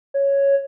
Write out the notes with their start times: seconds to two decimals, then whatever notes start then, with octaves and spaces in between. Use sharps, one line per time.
0.14 C#5